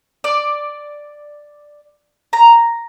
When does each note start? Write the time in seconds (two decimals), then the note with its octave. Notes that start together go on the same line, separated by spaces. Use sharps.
0.24 D5
2.33 A#5